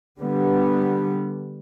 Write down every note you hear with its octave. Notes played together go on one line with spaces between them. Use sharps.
D3 G3 B3